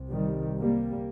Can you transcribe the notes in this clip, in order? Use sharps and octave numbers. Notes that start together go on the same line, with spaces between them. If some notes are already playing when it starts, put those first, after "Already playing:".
Already playing: C2 C3
D#3 G3
G3 A#3